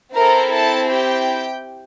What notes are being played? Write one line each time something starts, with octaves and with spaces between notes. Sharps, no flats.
C4 E4 A4 A#4 A#5
A4 A5
G4 G5